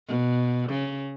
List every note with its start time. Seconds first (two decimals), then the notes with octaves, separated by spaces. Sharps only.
0.08 B2
0.70 C#3